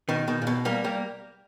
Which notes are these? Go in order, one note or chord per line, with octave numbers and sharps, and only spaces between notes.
B2 D#3
B2 D#3
A#2
B2
G3 A#3
G3 A#3